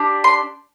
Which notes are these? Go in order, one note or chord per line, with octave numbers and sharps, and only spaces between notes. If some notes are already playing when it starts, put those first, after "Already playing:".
Already playing: D4 G4
C6